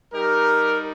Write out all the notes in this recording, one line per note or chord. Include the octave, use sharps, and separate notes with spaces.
G3 D#4 G4 A#4